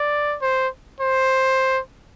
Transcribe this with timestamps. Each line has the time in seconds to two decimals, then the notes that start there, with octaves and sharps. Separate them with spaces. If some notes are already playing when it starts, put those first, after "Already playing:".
Already playing: D5
0.42 C5
1.01 C5